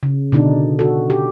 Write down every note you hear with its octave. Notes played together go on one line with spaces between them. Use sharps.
C#3
B2 D3 D4 D#4
F#4 A4
G4